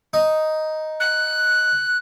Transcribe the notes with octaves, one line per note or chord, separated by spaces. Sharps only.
D#4
F#6